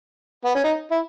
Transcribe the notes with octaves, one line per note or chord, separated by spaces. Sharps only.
B3
C#4
D#4
E4